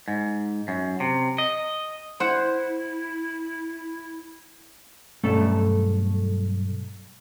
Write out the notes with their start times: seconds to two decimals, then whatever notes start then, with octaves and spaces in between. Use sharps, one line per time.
0.08 G#2
0.68 F#2
1.00 C3
1.38 D#5
2.20 E4 C5 F#5
5.23 B1 G2 A3 C#4 A4 A5